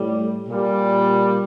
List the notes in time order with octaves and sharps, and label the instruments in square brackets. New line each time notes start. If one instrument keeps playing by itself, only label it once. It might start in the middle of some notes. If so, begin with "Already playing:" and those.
Already playing: [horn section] A2 G3
A#2 G3